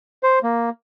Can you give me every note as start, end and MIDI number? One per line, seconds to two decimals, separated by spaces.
0.23 0.39 72
0.43 0.69 58